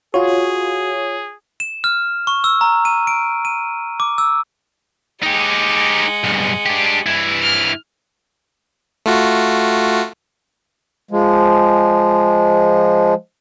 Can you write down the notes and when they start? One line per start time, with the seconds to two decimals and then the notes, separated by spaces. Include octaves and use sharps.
0.14 F4 F#4 G#4 C#5
1.60 E7
1.84 F6
2.27 C#6
2.44 E6
2.61 A#5
2.85 D#7
3.07 D7
3.45 D#7
4.00 D6
4.18 E6
5.23 G#3 D#4 G4 F#5
6.24 B1 G2
6.66 D4 G4
7.06 G2 E4
7.42 F6
9.06 A3 F4 F#4
11.11 F3 G#3